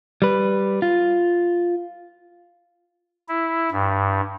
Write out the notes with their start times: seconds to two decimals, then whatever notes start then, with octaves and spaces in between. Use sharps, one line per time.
0.22 G3 B4
0.82 F4
3.29 E4
3.72 G2